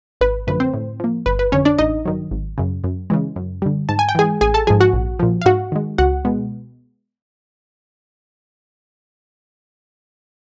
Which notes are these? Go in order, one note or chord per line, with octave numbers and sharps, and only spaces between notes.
G#1 B4
F#2 D3 F3 A3 B4
C4 C5
A2
F3 A#3
G1 B4
B4
F2 D3 C#4 C#5
D4 D5
A1 D#4 D#5
G2 D#3 F#3
G#1
F#2 C#3
F#2
C#3 E3 G#3
F#2
D3 G3
G#2 A5
G#5
G5
E3 G#3 G#4 G#5
A1 G#4 G#5
A4 A5
G#2 F3 G#4 G#5
F#4 F#5
A#1
A#2 F3
F5
G#2 F#4 F#5
D#3 G#3
C#2 F#4 F#5
B2 G#3 B3